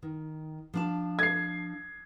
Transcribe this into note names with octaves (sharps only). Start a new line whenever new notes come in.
D#3
F3 D4 A5
G#6 C7